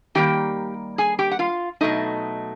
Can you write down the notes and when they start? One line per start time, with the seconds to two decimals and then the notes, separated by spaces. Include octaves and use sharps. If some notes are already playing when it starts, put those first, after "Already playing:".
0.15 D#3 G3 A#3 G4 G5
0.98 G#4 G#5
1.19 G4 G5
1.31 F#5
1.39 F4 F5
1.81 B2 F#3 A3 D#4 D#5